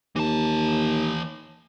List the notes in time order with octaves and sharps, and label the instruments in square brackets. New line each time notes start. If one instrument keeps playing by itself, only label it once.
[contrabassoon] D#2 [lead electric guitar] E3 A5